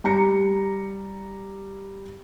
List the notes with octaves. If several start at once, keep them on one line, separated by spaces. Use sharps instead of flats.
G3 A#5 C#7